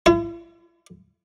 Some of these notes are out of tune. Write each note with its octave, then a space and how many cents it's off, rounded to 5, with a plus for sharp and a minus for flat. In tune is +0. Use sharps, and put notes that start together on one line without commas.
E4 +45